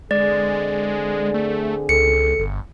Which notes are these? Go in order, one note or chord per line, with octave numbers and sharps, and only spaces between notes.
D3 G#3 C4 G#4 D5
A3
C#2 A4 C#7
G1